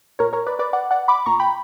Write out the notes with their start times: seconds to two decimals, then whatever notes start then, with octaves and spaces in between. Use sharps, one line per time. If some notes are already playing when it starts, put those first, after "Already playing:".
0.19 A#2 A#4 C#5
0.33 A#4 C#5
0.46 B4 D5
0.59 B4 D5
0.73 D5 F#5
0.91 D5 F#5
1.08 B5 D6
1.26 A#2 A#5 C#6
1.40 G5 B5